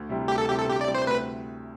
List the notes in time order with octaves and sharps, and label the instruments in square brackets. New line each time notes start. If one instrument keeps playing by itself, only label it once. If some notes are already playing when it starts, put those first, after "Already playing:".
Already playing: [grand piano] D2
C3 G3 C4 E4
[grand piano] D2 [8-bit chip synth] G4
[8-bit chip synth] A4
[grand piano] C3 G3 C4 E4 [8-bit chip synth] G4
[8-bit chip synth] A4
[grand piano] D2 [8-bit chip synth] G4
[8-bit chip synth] D5
[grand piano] C3 G3 C4 E4
[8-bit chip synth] C5
[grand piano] D2 [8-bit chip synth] B4